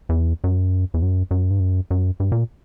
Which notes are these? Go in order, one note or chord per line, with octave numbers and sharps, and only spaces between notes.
E2
F#2
E2
F#2
F#2
G2
F#2
F#2
G2
A#2